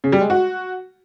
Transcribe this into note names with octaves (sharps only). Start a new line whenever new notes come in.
C#3
G3
G#3
F#4